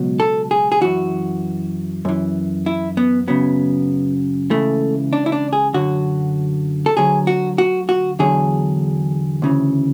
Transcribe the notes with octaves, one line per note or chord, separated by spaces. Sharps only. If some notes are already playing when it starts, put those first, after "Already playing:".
Already playing: C#2 B2 F#3
A4
G#4
G#4
F#2 E3 F#4
F#2 E3
E4
B3
F#2 C#3 F#3 B3
C#2 C#3 E3 A3
D4
E4
D4
G#4
F#2 D3 F#3 F#4
A4
D2 D3 F#3 G#4
F#4
F#4
F#4
E2 D3 F#3 G#4
D2 C#3 E3